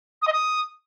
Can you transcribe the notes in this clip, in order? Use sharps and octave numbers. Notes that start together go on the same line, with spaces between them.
D#6
D#5
D#6